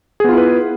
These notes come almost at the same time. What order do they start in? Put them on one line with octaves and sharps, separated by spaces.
G#4 B3 F4 E4 B4